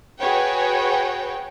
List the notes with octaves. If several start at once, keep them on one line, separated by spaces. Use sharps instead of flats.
F#4 G#4 B4 C#5 G5